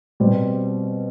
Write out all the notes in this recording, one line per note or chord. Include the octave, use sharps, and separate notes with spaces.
B2 G3 C4